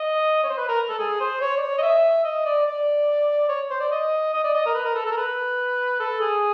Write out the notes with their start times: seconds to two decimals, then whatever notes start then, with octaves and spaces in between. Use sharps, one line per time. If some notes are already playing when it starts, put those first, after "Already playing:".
Already playing: D#5
0.43 C#5
0.49 C5
0.57 B4
0.68 A#4
0.89 A4
0.99 G#4
1.20 C5
1.41 C#5
1.57 D5
1.62 C#5
1.78 D#5
1.82 E5
2.24 D#5
2.45 D5
2.66 D5
3.49 C#5
3.70 C5
3.80 D5
3.92 D#5
4.33 D#5
4.44 D5
4.54 D#5
4.66 A#4
4.74 B4
4.85 A#4
4.95 A4
5.06 A4
5.11 A#4
5.17 B4
6.00 A4
6.20 G#4